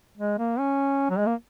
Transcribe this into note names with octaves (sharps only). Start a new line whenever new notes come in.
G#3
A#3
C#4
F#3
G#3
A#3